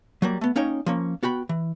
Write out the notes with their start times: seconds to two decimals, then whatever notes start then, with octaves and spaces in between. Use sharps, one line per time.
0.22 F#3 G3 A#3
0.41 A3 B3
0.56 A#3 C#4 D#4 C#5 G5
0.86 F3 A#3 C#4
1.23 B3 F#4 G5 B5
1.49 E3